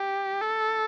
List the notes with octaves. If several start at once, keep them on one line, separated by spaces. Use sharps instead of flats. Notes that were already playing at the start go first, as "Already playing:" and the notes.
Already playing: G4
A4